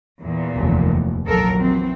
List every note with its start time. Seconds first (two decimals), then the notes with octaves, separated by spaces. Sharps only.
0.22 E2 A#2
0.56 F1 D#2
1.26 A#1 D#2 F#3 A4 A#4
1.60 E3 C4